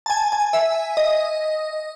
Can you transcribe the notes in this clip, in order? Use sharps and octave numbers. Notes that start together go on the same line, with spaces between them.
A5
G#5
G#5
E5
D#5